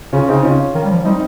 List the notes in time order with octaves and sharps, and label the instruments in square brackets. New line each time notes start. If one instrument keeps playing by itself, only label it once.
[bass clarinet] C#3 [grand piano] C#4 F4
[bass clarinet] C#3 [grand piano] C4 D#4
[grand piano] C#4 F4
[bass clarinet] D#3
G3
F3
[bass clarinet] G3 [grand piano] C4 D#4